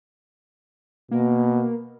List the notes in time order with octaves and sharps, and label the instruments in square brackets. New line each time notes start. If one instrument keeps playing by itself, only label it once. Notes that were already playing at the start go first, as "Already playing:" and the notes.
[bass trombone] B2 [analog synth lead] A#3